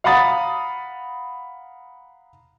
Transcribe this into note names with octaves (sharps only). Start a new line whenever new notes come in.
F5 F#5 A#5 B5 D#6 A6